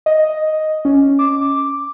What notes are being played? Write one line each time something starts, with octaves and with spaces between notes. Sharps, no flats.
D#5
C#4
D6